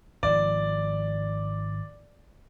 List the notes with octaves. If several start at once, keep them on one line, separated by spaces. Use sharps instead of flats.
G#1 F3 D5